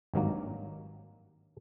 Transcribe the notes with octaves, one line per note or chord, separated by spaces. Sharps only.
G#1 G2 D#3 F#3 A#3